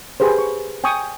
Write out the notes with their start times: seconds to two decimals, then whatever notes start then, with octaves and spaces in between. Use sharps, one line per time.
0.20 G4 G#4 B4 C5
0.39 C#6
0.84 G5 G#5 C#6 D#6